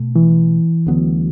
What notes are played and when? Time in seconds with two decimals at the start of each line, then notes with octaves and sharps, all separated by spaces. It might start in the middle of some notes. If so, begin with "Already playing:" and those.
Already playing: B2 A3
0.16 E3
0.87 D2 D3 F#3 B3